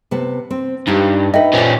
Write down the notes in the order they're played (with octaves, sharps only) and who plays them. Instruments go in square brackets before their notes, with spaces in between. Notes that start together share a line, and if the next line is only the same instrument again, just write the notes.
[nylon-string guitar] C3 B3 A5
C4
[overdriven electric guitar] G2 [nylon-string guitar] D#4 F4 G4
[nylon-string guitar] D#4 A4 B4 [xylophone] D#5 E5 G5
[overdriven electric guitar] A#2 C#4 [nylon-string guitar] C5 D5